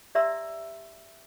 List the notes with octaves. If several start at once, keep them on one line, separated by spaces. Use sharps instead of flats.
G4 D5 E5 A#5 C6 E6